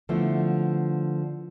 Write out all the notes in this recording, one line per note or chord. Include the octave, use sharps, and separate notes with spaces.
D3 F3 A3 B3 E4